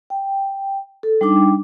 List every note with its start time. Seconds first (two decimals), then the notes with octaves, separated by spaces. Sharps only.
0.10 G5
1.03 A4
1.21 G3 D4 D#4 G5 D6